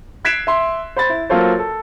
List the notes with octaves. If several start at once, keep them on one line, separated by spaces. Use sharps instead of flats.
F#6 G#6 B6 C7 D7 E7
E5 C6
C5 B5 A6
E4
F#3 A#3 F4 A4 C5 C#5
A4